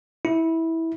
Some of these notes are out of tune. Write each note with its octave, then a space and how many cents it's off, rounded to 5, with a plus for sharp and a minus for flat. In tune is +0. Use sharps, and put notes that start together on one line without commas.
E4 -15